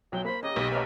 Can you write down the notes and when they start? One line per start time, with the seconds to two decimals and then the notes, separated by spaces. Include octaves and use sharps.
0.12 B1 F#3 G5
0.25 A#3 C5 B5
0.43 C#3 A#3 C#4 G4 D#5
0.56 B1
0.72 F#3 A3 A#3 B4 C#5 D#5 F6